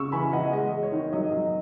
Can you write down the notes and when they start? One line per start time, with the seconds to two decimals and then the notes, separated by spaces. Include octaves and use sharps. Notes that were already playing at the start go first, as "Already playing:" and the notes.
Already playing: C#3 C#6 E6
0.12 E3 G#5 B5
0.32 E3 D#5 F#5
0.52 G#3 D#5
0.73 G#3
0.83 C#5
0.92 D#3
1.13 F#3 D#5
1.32 F#3 D#5